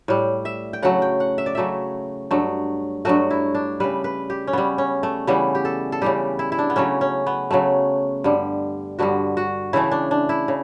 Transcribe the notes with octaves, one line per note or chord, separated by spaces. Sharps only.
A2 G3
E5
G5
C#3 F#3 A3 F#5
G5
F#5
E5
D5
C#3 F#3 A3 E5
G2 F#3 A3
G2 F#3 A3 F#4
E4
D4
C#3 G3 B4
B4
G4
C#4
C#3 G3 B3
C#4
A3
C#3 E3 G3 B3
G4
A4
A4
C#3 E3 G3 G4
E4
E4
D4
B3
C#3 F#3 A3 C#4
C#4
B3
C#3 F#3 A3
G2 D3 G3
G2 D3 G3 F#4
F#4
C#3 E3 A3 E4
D4
D4
E4
C#3